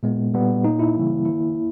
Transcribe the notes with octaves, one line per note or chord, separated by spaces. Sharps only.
A#2 G#3 B3
A#2 G3 B3
A#2 A#3 D#4
E4
C#3 E3 G3 A#3
D#3 A#3 E4
A#3